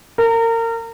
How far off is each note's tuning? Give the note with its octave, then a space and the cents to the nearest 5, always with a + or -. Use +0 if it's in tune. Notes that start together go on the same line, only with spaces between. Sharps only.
A#4 -30